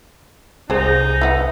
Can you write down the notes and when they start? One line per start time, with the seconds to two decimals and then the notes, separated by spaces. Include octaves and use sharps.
0.70 C2 D#4 G#4 C5
1.21 E4 B4 F#5